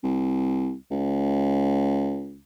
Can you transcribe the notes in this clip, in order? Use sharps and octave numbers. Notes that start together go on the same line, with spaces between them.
C2
C#2